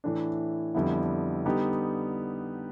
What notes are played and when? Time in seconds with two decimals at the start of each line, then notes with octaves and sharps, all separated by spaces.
0.04 A2 E3 A3 D4
0.74 F2 D3 G3 B3 E4
1.45 D3 G3 B3 D#4 G4